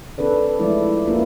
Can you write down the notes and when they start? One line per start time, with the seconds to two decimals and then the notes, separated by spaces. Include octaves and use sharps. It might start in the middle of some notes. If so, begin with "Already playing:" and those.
0.18 C4 D4 A4 B4 D5
0.59 F3 G#3 A3 E4 D5
1.07 A#3 C#4 E4 F4 A#4 B4